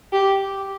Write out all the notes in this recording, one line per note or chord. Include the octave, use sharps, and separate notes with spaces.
G4